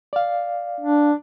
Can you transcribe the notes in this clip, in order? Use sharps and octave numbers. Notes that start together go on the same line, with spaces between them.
D5 F5
D4